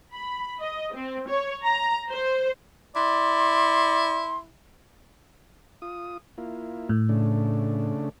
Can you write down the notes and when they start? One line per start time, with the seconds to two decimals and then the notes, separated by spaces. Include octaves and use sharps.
0.13 B5
0.60 D#5
0.93 C4
1.28 C#5
1.63 A#5
2.09 C5
2.96 E4 D5 C6
5.82 F4 D#6
6.38 A#3 E4 F4
6.89 A2
7.09 C#3 A3 D4